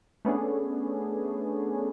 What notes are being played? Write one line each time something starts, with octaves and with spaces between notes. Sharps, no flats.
A3 B3 C#4 D4 G#4